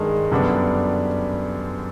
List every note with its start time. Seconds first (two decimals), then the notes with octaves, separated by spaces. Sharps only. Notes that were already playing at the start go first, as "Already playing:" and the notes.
Already playing: G2 D#3 G#3
0.31 F#2 D3 G3 B3 D4